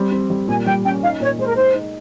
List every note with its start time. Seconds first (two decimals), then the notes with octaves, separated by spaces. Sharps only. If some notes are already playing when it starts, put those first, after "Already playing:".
Already playing: G3 C4
0.12 C4
0.30 G3
0.48 A#2 G#5
0.66 G3 G5
0.84 C#4 G5
1.02 D#4 F5
1.20 A#2 C#5
1.39 G#3 C5
1.46 A#4
1.55 D#4 C5
1.74 D#4